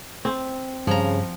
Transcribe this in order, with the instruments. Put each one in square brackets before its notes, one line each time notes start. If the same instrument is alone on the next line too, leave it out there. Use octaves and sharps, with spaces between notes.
[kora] C4
[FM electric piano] G2 [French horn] C#3 [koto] F3 A#5